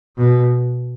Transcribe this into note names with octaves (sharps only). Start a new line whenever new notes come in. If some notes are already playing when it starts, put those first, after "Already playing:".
B2